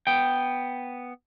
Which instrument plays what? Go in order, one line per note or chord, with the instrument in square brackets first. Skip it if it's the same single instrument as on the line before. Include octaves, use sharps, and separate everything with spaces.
[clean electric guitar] B3 G5